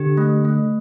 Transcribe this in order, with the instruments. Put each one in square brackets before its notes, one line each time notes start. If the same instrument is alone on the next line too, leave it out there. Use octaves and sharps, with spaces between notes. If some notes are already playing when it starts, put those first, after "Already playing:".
Already playing: [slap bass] D3 [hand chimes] G4
[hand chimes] A3
A3